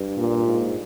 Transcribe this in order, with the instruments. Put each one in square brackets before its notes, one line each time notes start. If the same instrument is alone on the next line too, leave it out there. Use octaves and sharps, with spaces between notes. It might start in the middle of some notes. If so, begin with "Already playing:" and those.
Already playing: [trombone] G2
[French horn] A#2
[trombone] G#2